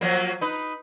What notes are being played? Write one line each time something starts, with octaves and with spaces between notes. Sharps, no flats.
F3 F#3 A#3
D#4 B4